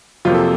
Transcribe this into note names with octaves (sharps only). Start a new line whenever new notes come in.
F2 C3 F#3 A#3 F4
A4